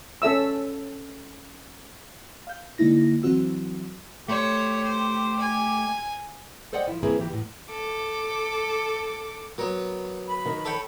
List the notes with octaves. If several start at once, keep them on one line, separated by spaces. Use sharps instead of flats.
C#4 A4 E5 E6
F5 G6
D3 G#3 A#3 D#4 E4 A#6
E3 F#3 C4 F#4 E6
A3 G4 C5 C#5
C5
G#5
A4 C5 D5 D#5 F#5 G5
F3 E4
E3 A#3 C4 E4 G#4 B4
E3 G4
E2 A2
A4 D6
F#3 B3 A#4
B5
D#3
A4 C#5 G5